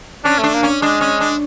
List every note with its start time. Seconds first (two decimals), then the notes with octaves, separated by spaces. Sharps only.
0.25 C#4 D4
0.39 A3 D4
0.54 A#3
0.63 C#4
0.82 G#3 D4
1.01 C#4
1.20 D4